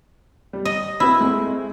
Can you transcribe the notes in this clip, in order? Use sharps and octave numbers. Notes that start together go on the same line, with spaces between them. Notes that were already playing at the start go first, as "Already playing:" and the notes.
G3
D#5
C4 E4 F#4 B4
G#3 A3 C4